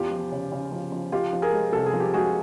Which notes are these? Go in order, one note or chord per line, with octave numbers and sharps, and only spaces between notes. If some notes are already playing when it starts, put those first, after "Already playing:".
Already playing: E2 F4 G4
F3
C#3
C#3
F3
F3
F3 F4 G4
F3
G#4 A#4
G#3
C2 A4
G#4
F3
G4
G#3 F#4 G#4